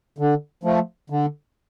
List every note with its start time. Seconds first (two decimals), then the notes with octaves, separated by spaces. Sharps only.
0.18 D3
0.63 F3 A3
1.10 D3